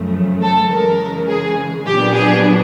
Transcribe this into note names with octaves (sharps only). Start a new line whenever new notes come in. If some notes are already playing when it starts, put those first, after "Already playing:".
Already playing: F#2 C#3 F3 A3
A4
C#3 E3 G#3 A#4
G#4
A#2 F#3 B3 D4 G4
G#4